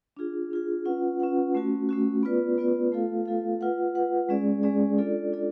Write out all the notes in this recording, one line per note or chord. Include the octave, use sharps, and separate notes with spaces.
D4 F4 G#4
D4 F4 G#4
C#4 F4 B4 F#5
C#4 F4 B4 F#5
A3 C#4 F#4
A3 C#4 F#4
B3 F4 B4 D5
B3 F4 B4 D5
A3 F4 A4 F5
A3 F4 A4 F5
F4 B4 F#5
F4 B4 F#5
G#3 C#4 G#4 D5
G#3 C#4 G#4 D5
D4 F4 A4 D5
D4 F4 A4 D5